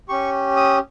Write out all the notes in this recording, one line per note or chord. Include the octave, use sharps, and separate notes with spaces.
C#4 G4 C#6
D#6